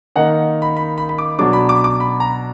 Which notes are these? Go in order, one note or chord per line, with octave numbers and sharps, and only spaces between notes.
D#3 A#3 D#4 F#5
B5
B5
B5
B5
D6
B2 F#3 D4 D6
B5
D6
D6
B5
A#5